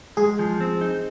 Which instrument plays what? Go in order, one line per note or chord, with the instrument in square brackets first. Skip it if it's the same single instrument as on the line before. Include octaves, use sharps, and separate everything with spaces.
[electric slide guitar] G#3 [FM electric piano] G#4
[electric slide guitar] F3
C4
D#4